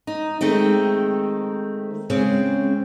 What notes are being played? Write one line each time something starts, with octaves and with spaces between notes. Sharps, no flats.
D#4
D#3 G#3 A3 C4
C#3 G#3 C4